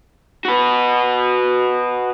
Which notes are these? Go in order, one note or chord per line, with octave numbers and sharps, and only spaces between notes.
F#4 B4